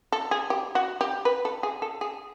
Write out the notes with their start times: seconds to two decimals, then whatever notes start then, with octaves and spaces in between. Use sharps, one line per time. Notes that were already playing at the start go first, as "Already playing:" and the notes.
0.12 A4
0.31 G#4
0.50 G4
0.75 F#4
1.01 G4
1.25 B4
1.45 A4
1.63 G#4
1.82 A4
2.01 G#4